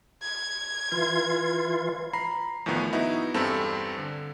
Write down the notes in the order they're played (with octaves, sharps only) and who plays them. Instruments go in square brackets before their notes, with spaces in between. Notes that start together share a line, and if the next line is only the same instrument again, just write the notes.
[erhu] G#6
[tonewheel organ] E3 F4
[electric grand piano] A#5 B5 C7
E2 A2 D#3 F3 B3
B3 D#4 E4 F#4
E2 G2 C4 A4
D3